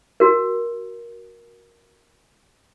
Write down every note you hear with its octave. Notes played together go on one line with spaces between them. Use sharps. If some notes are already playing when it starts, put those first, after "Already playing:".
F#4 A#4